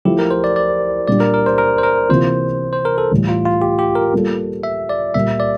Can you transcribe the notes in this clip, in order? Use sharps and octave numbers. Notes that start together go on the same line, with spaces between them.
F3 A3 E4 G4
A#4
C5
D5
D5
A#2 G3 D4 D5
A#4
A#4
C5
A#4
C5
A#4
C3 E3 A#3 F4 C5
C5
A#4
A4
A2 E3 G3
F4
F4
G4
G4
A#4
G3 A#3 F4 A4
E5
D5
A#2 G3 A#3 E5
D5